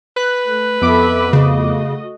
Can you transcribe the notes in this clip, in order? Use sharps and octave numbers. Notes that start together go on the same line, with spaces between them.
B4 F#6
A3
F2 B3 A4 E5 B5 D6
C#3 A3 F#4 D#5